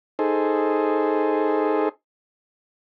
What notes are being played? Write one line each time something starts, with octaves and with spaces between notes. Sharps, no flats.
D#4 G#4 A4 C5